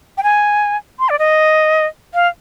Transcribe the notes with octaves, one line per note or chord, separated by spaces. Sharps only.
G5
G#5
C6
D5
D#5
F5